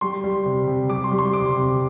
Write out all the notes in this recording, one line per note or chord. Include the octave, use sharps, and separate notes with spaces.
G3 C6
G3
C3
C3
G3 D6
C6
G3
C6
C3 D6
C3